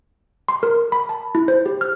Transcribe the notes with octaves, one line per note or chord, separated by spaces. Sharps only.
C6
A#4
B5
A5
E4
C5
G4
F6